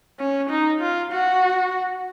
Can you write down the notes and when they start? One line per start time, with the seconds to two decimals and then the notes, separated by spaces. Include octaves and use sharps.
0.19 C#4
0.49 D#4
0.80 F4
1.11 F#4